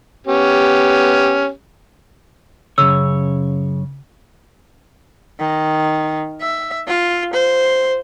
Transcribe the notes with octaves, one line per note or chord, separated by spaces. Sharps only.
B3 C#4 G4
F#2 C#3 C#5 E6
D#3
E5
F4
C5